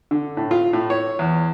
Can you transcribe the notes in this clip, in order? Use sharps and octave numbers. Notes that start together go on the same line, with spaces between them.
D3
A2
F4
A2
C#5
E2